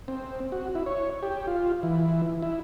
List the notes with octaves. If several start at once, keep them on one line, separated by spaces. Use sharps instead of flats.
C4
F#4
E4
C#5
G4
F4
E3
E4